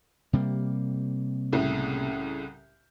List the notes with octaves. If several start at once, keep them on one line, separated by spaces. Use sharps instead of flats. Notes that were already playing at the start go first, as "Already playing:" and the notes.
C3 G3 A#3
C2 A2 C#3